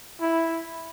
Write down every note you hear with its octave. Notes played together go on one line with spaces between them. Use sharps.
E4